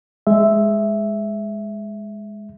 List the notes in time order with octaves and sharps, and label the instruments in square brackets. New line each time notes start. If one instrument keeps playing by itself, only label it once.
[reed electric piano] G#3 E5